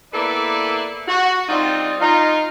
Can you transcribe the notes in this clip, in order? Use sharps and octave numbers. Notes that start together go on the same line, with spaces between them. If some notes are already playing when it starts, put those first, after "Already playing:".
A#3 B3 E4 A4 B4 D5
F#4
G3 C4 D4 D#4 F4
D#4 F4